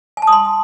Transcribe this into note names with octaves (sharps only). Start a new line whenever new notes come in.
G#5
A5
D#6
C6